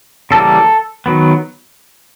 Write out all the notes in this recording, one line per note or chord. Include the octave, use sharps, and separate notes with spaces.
C#3 E3 G3 A#3 A4
D#3 F#3 B3